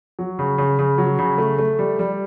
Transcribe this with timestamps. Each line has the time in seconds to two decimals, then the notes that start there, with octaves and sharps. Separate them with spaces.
0.19 F#3
0.39 C#3
0.58 C#3
0.79 C#3
0.98 F#3
1.19 C#3
1.38 A3
1.58 A3
1.79 G3
1.99 G3